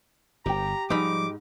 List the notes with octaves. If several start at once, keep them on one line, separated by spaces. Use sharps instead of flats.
G1 G4 G5 A#5
G#2 F3 G3 D#4 B5 D6